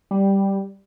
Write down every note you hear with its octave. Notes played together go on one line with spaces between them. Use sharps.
G3